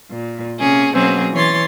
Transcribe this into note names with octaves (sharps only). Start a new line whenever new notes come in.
A#2
C3 A#3 C#4 G#4
B2 F#3 A#3 C4 C#4 G#4
E3 C#5 C6 A6